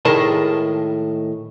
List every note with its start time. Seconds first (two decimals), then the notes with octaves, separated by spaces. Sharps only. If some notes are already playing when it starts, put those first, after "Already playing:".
0.05 A2 D#3 G#3 A#4 D#5 A5